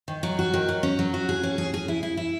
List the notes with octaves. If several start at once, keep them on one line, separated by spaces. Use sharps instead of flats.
D#3
F#3
F#4
D#3
F#3
C#4
F#3
F#4
G#4
C#4
G#4
G#4
E4
E4
E4